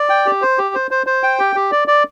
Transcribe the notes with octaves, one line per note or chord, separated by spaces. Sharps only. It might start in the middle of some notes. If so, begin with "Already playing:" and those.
Already playing: D5
G5
G4
C5
G4
C5
C5
C5
G5
G4
G4
D5
D5